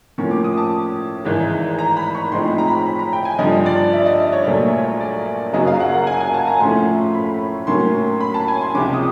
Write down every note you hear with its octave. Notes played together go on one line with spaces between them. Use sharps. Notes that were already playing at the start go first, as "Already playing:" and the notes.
A2 F3 A#3 C#4 C#6
D6
D#6
A5
G#1 G#2 E3 G#3
A#5
B5
C#6
A2 F3 G#3 C4 D#4 C6
B5
A#5
B5
A#5
B5
A#5
G5
G#5
G2 D3 F3 D#5
D5
E5
D5
D#5
D5
C#5
A#1 A#2 F#3 A3 C5
C#5
D5
F#1 F#2 C#3 F#3 D#5
F5
F#5
F#5
G#5
G#5
A5
A#5
A2 F3 A3 C#4 C6
B5
A2 F#3 A#3 C#4 C6
B5
A5
G#5
C6
C#2 C3 F3 G#3 C#4 D6
D#6